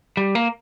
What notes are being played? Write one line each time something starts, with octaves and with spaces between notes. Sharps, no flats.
G3
A#3